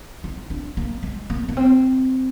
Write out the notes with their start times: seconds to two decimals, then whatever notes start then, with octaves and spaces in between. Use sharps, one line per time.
0.24 D#4
0.50 D4
0.77 A#3
1.03 G#3
1.30 A#3
1.48 A#3
1.57 C4